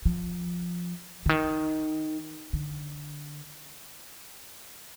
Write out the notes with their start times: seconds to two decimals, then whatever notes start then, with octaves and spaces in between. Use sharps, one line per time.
0.05 F3
1.26 D3
1.29 D#3
2.53 D3